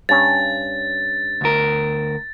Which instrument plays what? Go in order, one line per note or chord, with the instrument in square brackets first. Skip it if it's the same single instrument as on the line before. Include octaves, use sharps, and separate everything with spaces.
[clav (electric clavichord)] G2 C#4 [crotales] A6
[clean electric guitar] D2 A#4